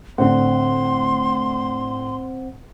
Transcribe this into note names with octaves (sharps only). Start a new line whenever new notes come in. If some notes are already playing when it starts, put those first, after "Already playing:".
A2 D3 C4 C5 F#5 C6